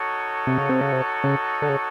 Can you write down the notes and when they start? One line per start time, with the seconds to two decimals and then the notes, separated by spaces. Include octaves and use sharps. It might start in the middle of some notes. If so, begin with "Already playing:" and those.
Already playing: D#4 F#4 A4 C#5
0.47 C3
0.58 C#3
0.69 C3
0.81 C#3
0.92 C3
1.24 C#3
1.62 D3
1.69 C#3